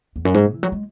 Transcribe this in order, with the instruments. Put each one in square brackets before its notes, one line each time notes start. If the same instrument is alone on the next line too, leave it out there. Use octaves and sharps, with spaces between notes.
[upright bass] E2
F#2
G#2
A#2
E3
F#3
G#3